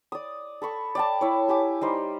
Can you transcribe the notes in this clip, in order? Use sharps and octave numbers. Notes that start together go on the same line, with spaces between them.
D5 D#6
A4 B5 C#6
D5 G5 A5
E4 C#5
G4 G#5 D6
G3 D#4 C5